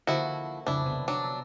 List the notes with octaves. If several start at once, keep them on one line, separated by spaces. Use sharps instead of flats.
D3 F3 A#3 E4 F#4
C2 F2 C#3 D4 E4
C3 B3 E7
F#3 D4
A5 A#5 E6